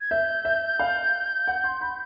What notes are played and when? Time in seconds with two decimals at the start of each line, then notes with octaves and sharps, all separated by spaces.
0.01 G#6
0.11 E5 G6
0.45 E5
0.79 F5
1.47 F#5
1.64 C6
1.81 B5